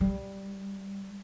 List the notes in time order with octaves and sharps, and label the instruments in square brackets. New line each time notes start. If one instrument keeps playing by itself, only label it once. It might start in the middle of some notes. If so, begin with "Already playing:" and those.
[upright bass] G3